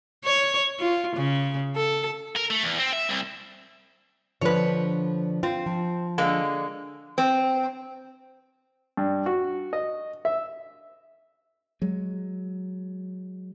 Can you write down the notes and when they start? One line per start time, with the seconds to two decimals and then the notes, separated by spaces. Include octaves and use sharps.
0.25 C#5
0.79 F4
1.16 C#3
1.76 A4
2.36 A#4
2.50 A3
2.64 E2
2.79 C4
2.93 E5
3.09 C2
4.41 D3 F3 D4 B4 C#5
5.43 C4 F4
5.66 F3
6.18 D3 G#3 A#3
7.18 C4
8.97 G2
9.26 F#4
9.73 D#5
10.25 E5
11.82 F#3 G#3